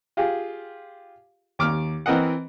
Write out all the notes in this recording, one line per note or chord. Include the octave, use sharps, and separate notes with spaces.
F4 G4 G#4
D#2 D6 F6
E3 C4 A#4 D#5 F#5